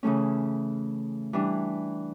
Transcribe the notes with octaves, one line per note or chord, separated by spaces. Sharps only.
C#3 E3 A3 C#4
E3 G3 D4